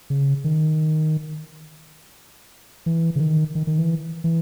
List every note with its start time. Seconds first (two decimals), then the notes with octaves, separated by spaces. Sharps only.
0.10 C#3
0.44 D#3
2.86 E3
3.16 C#3
3.20 D#3
3.55 D#3
3.67 D#3
3.79 E3
4.24 E3